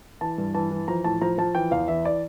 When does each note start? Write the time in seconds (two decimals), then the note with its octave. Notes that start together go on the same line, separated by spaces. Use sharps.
0.21 E3 A5
0.38 G2
0.54 E3 A5
0.71 E3
0.88 F3 A#5
1.04 A2 A5
1.21 F3 A#5
1.38 F3 A5
1.55 E3 G5
1.71 E2 F5
1.88 E3 E5
2.05 D5